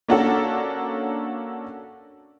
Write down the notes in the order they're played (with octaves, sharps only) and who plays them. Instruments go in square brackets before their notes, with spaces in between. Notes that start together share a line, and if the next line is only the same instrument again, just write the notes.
[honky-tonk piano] A#3 C#4 D4 F#4 A4